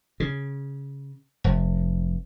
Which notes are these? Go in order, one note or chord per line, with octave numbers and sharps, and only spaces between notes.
C#3
F1